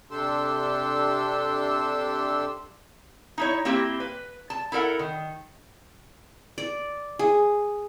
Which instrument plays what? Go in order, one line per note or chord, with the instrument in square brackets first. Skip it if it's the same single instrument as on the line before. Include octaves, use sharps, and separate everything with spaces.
[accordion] C3 D4 G4 A4 C6 E6
[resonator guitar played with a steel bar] D#4 E4 C#5
A#3 C4 E4 G4
B4
A5
E4 A4 A#4 F#5
D#3
[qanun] D5
G#4